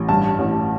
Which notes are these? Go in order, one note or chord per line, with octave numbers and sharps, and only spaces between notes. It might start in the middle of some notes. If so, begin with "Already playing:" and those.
Already playing: A1
G2 A5
A1